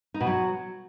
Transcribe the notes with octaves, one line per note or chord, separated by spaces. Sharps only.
D#4
B2
F#3